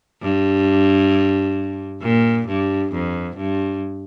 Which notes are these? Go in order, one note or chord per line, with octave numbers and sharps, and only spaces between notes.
G2
A#2
G2
F2
G2